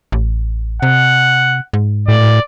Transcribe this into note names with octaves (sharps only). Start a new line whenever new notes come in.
A1
C3 F#5
G#2
A2 D5